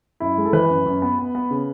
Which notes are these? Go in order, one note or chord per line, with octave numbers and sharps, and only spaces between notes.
F#2 E4
G#3
A4
E3 B4
F#2
F#2
B3
B3
B3
C#3